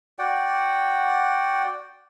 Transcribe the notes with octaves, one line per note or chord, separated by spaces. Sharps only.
F#4 D5 F#5 G5